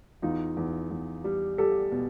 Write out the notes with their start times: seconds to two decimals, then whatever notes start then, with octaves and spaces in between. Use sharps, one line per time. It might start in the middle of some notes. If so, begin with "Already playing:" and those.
0.22 E2 D#4 F4
0.57 E2
0.91 E2
1.24 G3
1.58 G3 G4 A4
1.92 B2